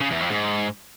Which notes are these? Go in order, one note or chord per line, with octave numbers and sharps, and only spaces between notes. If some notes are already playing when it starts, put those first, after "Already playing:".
C#3
E2
F2
G#2